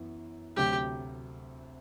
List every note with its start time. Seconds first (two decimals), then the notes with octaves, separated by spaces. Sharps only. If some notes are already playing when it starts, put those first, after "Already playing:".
Already playing: F#2 E3 B3 E4
0.56 D2 C3 F#3 G4